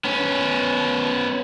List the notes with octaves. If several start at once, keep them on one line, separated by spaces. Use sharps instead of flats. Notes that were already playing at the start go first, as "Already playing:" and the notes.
B3 C#4